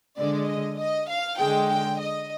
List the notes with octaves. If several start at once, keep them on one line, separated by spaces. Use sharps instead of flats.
D3 G#3 D5
D#5
D#5
F5
D3 G#3 G5
G5
D#5